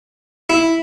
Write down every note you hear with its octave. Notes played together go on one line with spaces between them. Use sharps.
E4